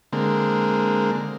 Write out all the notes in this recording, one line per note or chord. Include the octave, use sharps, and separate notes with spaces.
D3 G#3 A#3 C4